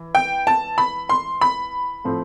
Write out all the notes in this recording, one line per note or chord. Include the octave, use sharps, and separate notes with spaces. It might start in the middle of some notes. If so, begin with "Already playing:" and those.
Already playing: E3
G5
A5
B5
C6
B5
A2 F3 A3 C4